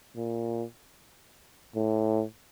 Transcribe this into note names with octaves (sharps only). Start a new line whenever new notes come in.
A#2
A2